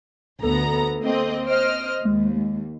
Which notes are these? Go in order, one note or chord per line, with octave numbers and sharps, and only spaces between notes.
D2 B3 A4 A#5
A#3 C4 D#5
C5 D#5 F6 D7
D#2 G#3
G#3